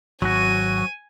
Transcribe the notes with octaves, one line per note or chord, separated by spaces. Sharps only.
G#1 F#3 F#4 G#5 D#7